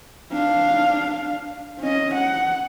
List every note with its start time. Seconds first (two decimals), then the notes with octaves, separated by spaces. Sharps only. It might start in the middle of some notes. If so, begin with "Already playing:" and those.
0.32 D4 F5
1.81 C#4 D#5
2.15 F#5